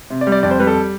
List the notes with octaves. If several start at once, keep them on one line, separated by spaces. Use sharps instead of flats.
C3
D5
G3
D5
F2 D5
C5
G3 B4
A4